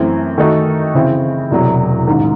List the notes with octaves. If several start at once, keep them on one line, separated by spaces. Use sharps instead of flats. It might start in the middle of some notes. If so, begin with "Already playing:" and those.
Already playing: F#2 E3 A3 C4
D#3 A3 D#4 F#4 A4
C#3 E3 C4 E4
E1 E2 C3 F#3
A1 G#2 D#3